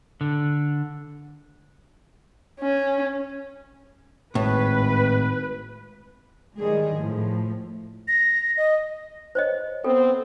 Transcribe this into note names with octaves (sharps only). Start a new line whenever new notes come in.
D3
C#4
G#1 A2 B4
D#3 G3 G#3 G#4
A2 F3
A#6
D#5
C5 C#5 D#5
B3 C4 A4